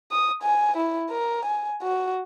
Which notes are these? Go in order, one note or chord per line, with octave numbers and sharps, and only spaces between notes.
D#6
G#5
E4
A#4
G#5
F#4